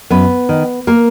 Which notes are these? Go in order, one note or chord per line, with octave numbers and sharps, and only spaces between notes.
F#2 B3 B4
D#3
A#3 A#4